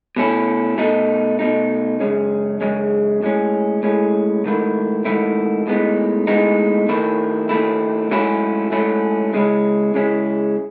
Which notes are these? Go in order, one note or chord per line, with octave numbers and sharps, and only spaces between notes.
B2 A3 C#4 E4
B2 A3 D#4
B2 A3 D#4
F#2 C#3 G#3 C#4
F#2 C#3 G#3 C#4
A2 G#3 C#4
A2 G#3 C#4
G#2 D#3 A3 E4
G#2 D#3 A3 E4
A2 G#3 B3 D#4
A2 G#3 B3 D#4
D#2 D#3 A3 E4
D#2 D#3 A3 E4
G#2 F#3 A3 C#4 E4
G#2 F#3 A3 C#4 E4
C#3 G#3 C#4 E4
C#3 G#3 C#4 E4